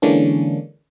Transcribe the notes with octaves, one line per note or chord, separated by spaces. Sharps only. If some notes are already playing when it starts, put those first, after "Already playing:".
D3 E3 G#3 A#3 C#4 D4